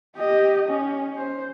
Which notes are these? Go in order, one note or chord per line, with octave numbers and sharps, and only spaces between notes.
G4 D#5
C#4
C5